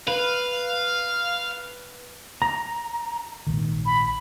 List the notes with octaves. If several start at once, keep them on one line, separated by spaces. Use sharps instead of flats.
B4 F5
A#5
A#1 G#2 D#3
B5